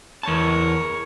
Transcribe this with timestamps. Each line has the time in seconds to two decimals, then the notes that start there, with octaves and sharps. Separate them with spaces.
0.23 E2 A#4 C#5 A5